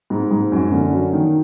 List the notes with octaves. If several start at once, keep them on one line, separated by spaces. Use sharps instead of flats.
G#2
G#2
F#2
D3
F#3
D#3